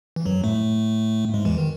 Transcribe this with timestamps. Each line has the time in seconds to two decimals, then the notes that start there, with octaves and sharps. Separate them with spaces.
0.16 E3
0.26 F#2 F#3
0.44 A2 A3
1.34 G#2 G#3
1.45 E2 E3
1.58 D#3